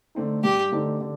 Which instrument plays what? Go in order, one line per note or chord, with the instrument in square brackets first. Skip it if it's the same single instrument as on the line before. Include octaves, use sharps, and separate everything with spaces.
[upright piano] D3 A3 C4 D#4
[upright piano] G2 [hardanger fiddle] G4
[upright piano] D3 A3 C4 D#4
D3